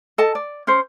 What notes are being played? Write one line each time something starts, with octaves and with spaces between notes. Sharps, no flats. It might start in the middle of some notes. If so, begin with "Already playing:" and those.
A4 D#5 A5
D5
C#4 C5